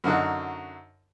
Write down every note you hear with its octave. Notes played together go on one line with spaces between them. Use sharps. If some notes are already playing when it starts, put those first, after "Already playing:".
F#2 D3 D#4 F#4